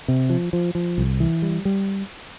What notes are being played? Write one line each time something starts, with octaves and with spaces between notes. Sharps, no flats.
C3
F3
F3
F3
C2
E3
G3
G3